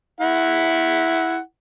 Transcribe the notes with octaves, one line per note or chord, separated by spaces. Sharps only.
E4 F#5